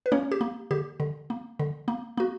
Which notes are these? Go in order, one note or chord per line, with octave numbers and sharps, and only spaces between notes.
B4
A#3 C#4 C#5
G4
A#3
D3 G4
D3
A#3
D3
A#3
A#3 F#4